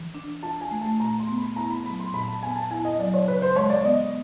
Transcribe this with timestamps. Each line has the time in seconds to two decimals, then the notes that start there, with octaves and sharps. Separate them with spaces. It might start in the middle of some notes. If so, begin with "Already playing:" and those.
Already playing: E3
0.15 D4
0.43 F4 A5
0.61 G#5
0.71 A3
0.81 A5
1.00 A#2 A#5
1.19 C6
1.28 B3
1.38 B5
1.56 E4 A#5
1.70 B5
1.85 F#3 B5
1.99 C6
2.13 A#2 B5
2.28 A5
2.42 B3 G#5
2.56 A5
2.71 E4 G#5
2.85 D#5
2.99 F#3 D5
3.14 C#5
3.28 C#3 B4
3.42 C5
3.56 G#3 C#5
3.70 D5
3.84 B3 D#5